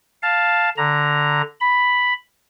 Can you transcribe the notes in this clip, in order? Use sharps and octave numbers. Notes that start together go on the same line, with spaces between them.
F5 A5
D3 A#5
B5